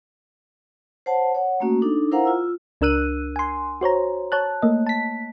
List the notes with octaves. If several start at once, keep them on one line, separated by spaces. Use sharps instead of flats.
C5 C#5 F#5 A5
C#5 F#5
A3 A#3 C#4 F#4
D4 D#4 A4
E4 A#4 C5 F5 F#5 A#5
F4 E6
C#2 D4 A#4 E6 F#6 D#7
G#5 C6
F#4 C5 C#5 A#5
C#5 A5 F#6
A3 A#3 D#5
A5 B6